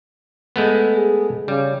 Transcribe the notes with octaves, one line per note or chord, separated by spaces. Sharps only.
G#3 A3 B3
G#4
C#3 G3